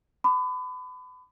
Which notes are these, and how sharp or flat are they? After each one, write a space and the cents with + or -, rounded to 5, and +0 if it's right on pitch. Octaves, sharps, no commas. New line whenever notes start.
B5 +35 D6 +30